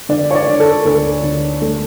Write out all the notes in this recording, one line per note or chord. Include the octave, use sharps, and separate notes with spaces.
D3 D5
C#5
D5
D3
A4
D2 A4
D2
A3